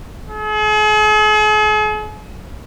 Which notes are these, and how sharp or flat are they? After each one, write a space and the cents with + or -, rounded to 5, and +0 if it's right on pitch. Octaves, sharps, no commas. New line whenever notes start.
G#4 +45